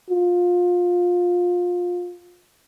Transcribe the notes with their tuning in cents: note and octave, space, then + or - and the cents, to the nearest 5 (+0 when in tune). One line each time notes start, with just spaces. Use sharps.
F4 +20